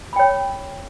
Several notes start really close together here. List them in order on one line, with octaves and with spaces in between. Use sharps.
B5 G5 C#5